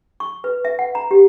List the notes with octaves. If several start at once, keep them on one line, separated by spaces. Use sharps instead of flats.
C#6
B4
E5
F#5
A#5
G4